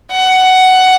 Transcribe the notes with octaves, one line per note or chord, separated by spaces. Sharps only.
F#5